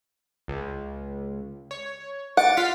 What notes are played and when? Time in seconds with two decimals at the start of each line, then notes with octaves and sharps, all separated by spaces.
0.48 C#2
1.71 C#5
2.37 F#5 D6 A6
2.57 F4 F5 B6